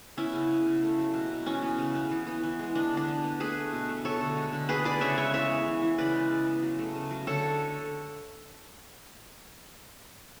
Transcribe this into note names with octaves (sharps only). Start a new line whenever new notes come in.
B3 C#4 E4
C#3
B3
C#3
A3
F#3
B2
B2
E3 C#4
B3
C#3
B3
E3
B3
E3
G#3
B3 D4
D3
D4
B3
B3
A3 G#4 B4
A3
B2
A3
B3 A4 C#5
D3
G#3
D3
B3 G#4 B4
B3 B4 D5
C#3 C#5 E5
G#3 C#5 E5
E3 C#5 E5
B3
E3
E3
C#3 B4 D5
G#3
C#3
B3
F#3
A3
C#3
F#3
D3 A4 C#5